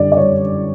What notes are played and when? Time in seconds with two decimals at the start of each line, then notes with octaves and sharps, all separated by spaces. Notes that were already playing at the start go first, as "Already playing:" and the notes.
Already playing: F#2 D3 G3 D5
0.12 D5
0.17 D3 G3 C#5